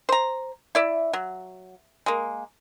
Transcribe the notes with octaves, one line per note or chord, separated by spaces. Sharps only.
C5 A#5
E4 D5 E5
F#3
G#3 A#3